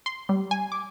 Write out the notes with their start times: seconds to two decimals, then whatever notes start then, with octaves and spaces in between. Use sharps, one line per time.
0.06 C6
0.29 G3
0.51 G#5
0.72 D6